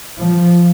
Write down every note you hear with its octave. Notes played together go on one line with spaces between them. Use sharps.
F3